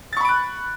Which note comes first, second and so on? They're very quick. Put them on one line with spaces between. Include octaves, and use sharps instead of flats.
A6 C#6 B5 D7 F#6